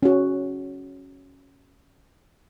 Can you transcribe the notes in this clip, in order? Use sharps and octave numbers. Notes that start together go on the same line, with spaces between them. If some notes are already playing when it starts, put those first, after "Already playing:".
C#4 F#4